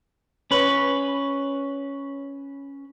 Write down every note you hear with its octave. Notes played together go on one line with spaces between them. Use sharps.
C#4 B4